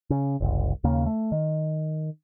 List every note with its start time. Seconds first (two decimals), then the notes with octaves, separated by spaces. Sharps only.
0.10 C#3
0.41 F#1 C2
0.84 D#2 C#3 A#3
1.06 A3
1.32 D#3